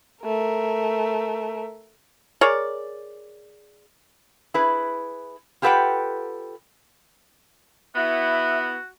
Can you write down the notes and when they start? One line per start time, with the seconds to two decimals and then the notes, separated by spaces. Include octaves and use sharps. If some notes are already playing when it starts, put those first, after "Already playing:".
0.23 A3 A#4
2.41 G#4 A#4 C#5 D5
4.54 E4 G#4 B4
5.62 F4 G4 A4 B4 F#5 G5
7.96 B3 E4 F#4 E5